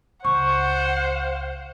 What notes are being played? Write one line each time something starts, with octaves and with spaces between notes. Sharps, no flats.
C#2 C5 F#5 C#6